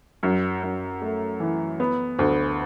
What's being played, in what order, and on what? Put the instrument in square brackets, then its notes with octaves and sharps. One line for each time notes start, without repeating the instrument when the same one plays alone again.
[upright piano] F#2
F#2
A3
E3
B3
D2